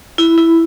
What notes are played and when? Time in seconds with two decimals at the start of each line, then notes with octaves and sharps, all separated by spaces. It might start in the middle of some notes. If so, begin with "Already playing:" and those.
0.18 E4
0.38 E4